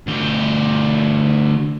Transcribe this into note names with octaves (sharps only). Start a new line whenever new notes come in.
D2 G4